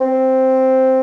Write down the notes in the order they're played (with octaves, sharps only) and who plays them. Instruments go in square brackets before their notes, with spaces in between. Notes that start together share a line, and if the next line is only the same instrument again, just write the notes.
[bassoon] C4